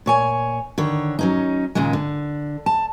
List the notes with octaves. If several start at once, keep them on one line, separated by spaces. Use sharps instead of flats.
A#2 C#5 G#5
D3 D#3 C#5
F#3 C#4 D#4
D#2 A#2 C#3 G#3
D3
A5